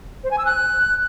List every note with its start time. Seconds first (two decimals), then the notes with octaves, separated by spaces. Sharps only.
0.24 C5
0.31 G#5
0.38 E6
0.46 F#6